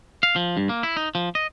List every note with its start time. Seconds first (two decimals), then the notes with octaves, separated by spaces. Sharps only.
0.23 F5
0.36 F3
0.57 G2
0.69 A#3
0.83 E4
0.97 D#4
1.15 F3
1.35 D#5